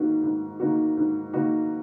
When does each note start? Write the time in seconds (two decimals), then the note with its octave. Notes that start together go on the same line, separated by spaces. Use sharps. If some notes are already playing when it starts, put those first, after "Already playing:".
Already playing: G#2 D#3 A#3 D#4 F#4
0.23 G#2
0.60 D#3 A#3 D#4 F#4
0.97 G#2
1.33 D#3 A#3 D#4 F#4